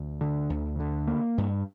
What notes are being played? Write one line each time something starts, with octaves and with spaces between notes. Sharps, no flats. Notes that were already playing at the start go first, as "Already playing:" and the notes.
Already playing: D2
D3
D2
D3
A#3
G2